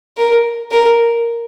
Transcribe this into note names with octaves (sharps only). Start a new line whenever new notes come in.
A#4
A#4